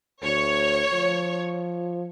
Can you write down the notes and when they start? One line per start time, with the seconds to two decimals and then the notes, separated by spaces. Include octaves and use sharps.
0.23 D2 C#5
0.93 F3